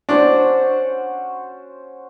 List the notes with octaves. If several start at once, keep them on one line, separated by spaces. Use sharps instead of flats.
C#4 D4 F#4 C5